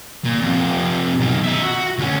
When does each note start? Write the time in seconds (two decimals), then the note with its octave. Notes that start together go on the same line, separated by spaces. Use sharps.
0.25 A#2
0.42 F2 C3
1.19 B1 D#3
1.44 D#4 E5
1.64 F#4
1.98 D2 C#4